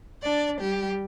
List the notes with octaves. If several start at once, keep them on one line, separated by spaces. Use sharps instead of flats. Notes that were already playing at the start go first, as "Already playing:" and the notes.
D4 D5
G3 G4